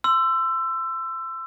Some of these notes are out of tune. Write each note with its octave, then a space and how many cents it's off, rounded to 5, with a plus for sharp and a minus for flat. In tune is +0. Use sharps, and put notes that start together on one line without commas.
C6 -10 E6 +20